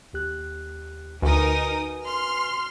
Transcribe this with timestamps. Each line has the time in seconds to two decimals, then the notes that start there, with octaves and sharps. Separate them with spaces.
0.13 D#2 G4 F#6
1.22 D2 D#4 F#4 A#4 B4 G#5 D#6
2.02 C6 F6